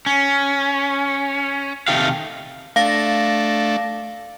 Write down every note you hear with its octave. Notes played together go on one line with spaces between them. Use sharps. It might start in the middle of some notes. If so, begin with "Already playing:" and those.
C#4
C3 D#3 A3 G4 F5
A3 D4 F5 A#6